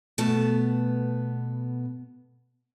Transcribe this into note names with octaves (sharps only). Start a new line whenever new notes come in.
B2 A3 B3 A5